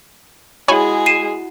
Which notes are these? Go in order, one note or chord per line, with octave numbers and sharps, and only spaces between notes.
G#3 E4 F#4 G#4 C#5 F#5 G#5 B5
C7 D#7 E7